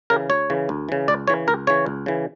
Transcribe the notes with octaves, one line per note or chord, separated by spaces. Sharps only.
C#3 E3 A#4
D2 C#5
C#3 E3
D2
C#3 E3
C#2 D5
C#3 E3 C#5
C#2 A#4
C#3 E3 C#5
C#2
C#3 E3